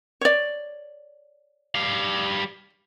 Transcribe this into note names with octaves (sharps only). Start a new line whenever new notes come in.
C#5 D5
G3 F5